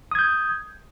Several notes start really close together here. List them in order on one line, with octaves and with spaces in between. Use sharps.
D#6 G#6 G6